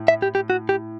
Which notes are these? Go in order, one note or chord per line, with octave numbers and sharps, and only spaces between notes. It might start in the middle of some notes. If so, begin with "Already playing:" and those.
Already playing: A2
E5
G4
G4
F#4
G4